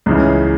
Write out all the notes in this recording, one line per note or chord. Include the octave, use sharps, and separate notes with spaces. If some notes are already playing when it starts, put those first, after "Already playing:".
C#2 C#3 E3